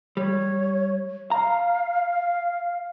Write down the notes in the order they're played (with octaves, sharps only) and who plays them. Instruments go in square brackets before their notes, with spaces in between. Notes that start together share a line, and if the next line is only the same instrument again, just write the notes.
[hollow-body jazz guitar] G3 [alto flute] C#5
[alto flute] F5 [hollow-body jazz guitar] A#5